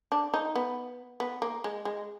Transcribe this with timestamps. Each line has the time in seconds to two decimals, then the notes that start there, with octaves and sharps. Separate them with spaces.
0.12 D4
0.34 D#4
0.55 B3
1.20 B3
1.42 A#3
1.64 G#3
1.85 G#3